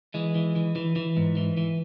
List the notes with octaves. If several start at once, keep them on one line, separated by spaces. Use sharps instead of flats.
E3 G#3
E3
E3
E3
E3
G#2
E3
E3